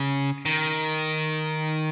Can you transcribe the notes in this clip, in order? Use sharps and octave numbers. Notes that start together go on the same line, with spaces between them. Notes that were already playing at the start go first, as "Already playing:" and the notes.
Already playing: C#3
D#3